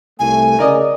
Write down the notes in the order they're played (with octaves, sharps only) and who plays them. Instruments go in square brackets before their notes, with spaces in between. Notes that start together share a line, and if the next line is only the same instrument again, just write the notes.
[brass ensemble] C2 A3 [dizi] G#5
[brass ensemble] C#3 [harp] A#4 D5 D#5